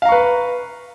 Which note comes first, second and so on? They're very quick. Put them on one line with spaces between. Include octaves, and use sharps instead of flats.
F5 A#5 C#6 B4